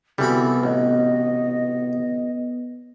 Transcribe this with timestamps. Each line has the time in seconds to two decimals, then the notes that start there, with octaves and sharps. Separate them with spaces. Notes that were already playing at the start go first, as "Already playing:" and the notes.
0.18 C2 B2 E3 G3 A4 B5
0.63 A1 B3 D#5